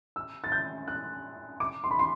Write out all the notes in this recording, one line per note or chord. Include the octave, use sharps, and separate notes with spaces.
E6
A6
G6
F#6
D6
C6
B5
C6